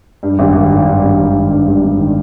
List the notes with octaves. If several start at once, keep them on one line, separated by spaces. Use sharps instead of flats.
G2
G#1
G#1
D#3
G2
G#1
G#1
D#3
G2
G#1
G#1
D#3